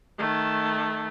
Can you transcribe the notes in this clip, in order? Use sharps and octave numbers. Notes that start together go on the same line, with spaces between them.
D#3 A3